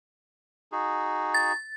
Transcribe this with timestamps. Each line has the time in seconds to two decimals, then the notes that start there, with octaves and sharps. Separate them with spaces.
0.72 D#4 F#4 G#4
1.34 A6